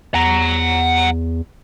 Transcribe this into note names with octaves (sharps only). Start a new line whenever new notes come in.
E2 F#5 A#5